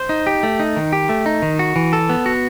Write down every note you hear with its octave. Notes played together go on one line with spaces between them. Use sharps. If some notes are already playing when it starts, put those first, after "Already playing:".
Already playing: C5
D#4
G4
A3
D#4
D#3
G4
A3
D#4
D#3
F#4
E3
A4
B3
F#4